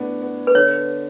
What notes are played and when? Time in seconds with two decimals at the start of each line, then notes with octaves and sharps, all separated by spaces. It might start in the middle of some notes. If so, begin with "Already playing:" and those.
Already playing: A2 B3 D4
0.22 B3
0.47 B4
0.55 D3 C#5